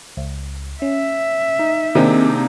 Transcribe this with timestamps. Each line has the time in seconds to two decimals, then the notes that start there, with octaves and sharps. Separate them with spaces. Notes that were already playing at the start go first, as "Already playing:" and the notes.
0.17 C#2
0.82 C#4 E5
1.59 D#4
1.95 C3 D#3 A#3 C4 D4 D#4 G#4